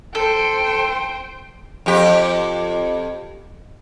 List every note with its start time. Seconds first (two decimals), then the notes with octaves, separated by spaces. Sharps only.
0.15 A4 C5 G5
1.86 F2 G4